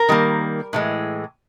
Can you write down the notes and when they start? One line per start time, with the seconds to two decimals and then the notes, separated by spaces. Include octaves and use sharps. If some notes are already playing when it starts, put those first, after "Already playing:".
Already playing: A#4
0.09 D#3 G3 A#3
0.73 A2 E3 G#3